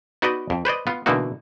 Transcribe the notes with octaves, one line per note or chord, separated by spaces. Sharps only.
B3 D#4 F#4 B4 D5 D#5
F2
B4 C5 D5 D#5
B3 F4
B2 D3 E3 A#3 D#4 F#4